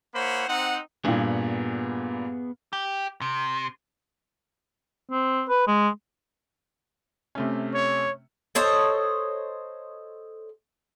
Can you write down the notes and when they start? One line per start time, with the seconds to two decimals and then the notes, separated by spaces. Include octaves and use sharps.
0.14 A#3 E4 C5 C#5 F#5 B5
0.48 C4 D#4 F#5
1.05 G2 A#2 B3 G#4
2.73 G4
3.21 C3
5.11 C4
5.49 B4
5.67 G#3
7.35 C3 A3 C#4
7.74 C#5
8.55 A4 C5 C#5 D#5